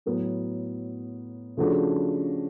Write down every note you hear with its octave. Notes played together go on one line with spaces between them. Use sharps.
A2 F#3 B3
C#3 F3 A3 D4 F#4